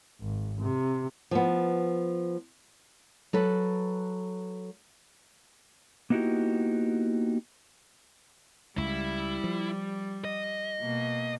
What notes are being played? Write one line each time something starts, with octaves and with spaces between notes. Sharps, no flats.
G#1
C3
F3 B3
F#3 A4 B4
A#3 B3 D#4 E4 F#4 G4
C#2 G3 E4
F3
D#5
B2 A#3